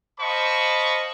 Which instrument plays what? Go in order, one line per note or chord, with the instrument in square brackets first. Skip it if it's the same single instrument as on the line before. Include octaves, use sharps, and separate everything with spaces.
[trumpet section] C5 D#5 F5 A5 B5 C#6